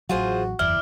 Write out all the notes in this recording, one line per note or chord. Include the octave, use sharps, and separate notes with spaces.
A1 F#3 F4 F#4 G#4 C5
F#1 E2 D4 E4 F6